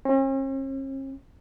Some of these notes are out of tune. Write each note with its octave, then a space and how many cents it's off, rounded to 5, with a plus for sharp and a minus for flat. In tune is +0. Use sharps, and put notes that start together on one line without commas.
C#4 -45